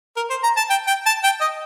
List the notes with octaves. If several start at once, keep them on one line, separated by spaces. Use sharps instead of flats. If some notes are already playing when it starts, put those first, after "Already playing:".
A#4
C5
A#5
A5
G5
G5
A5
G5
D#5